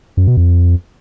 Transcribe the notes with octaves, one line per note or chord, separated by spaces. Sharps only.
F#2
B2
F2